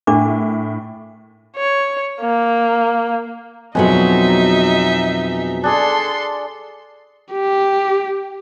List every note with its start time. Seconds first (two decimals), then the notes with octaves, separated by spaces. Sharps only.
0.07 A2 D4 A#4 D6
1.56 C#5
2.21 A#3
3.75 F2 B2 F#3 G#3 D#4 E5
5.64 D4 G#4 A4 C6
7.32 G4